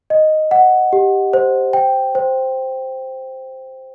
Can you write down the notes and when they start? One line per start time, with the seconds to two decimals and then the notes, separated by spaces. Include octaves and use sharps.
0.10 D#5
0.51 F#5
0.93 G4
1.33 C5
1.73 G5
2.15 C5